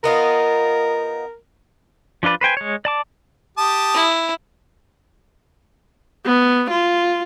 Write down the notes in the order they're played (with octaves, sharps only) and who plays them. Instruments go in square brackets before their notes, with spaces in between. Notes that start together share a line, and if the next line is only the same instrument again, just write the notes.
[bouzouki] B3 D#4 F4 [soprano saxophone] A#4
[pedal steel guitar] F3 D4 F4 B4 D5
B4 C5 G5 G#5
G#3 C#5
D5 A5 D6
[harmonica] G4 A5 D#6
[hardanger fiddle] E4
[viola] B3
F4